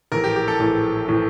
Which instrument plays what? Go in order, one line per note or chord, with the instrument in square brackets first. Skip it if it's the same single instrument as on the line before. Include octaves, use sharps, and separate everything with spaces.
[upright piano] A#1 A2 E3 [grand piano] A#4
[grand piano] G4
G4
A4
[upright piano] A#1 A2 E3
A2 E3